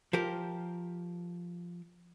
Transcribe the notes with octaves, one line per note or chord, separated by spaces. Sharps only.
F3 G4 A#4